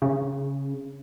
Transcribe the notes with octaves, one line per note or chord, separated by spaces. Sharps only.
C#3